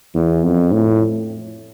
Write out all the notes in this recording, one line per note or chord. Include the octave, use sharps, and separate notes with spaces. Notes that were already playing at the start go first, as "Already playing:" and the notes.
E2
F2
A2